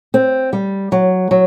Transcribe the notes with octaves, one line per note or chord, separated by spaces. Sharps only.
C4
G3
F#3
F#3